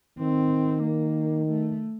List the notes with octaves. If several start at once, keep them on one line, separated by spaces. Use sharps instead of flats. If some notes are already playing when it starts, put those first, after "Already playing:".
D#3 C4
A#3
A3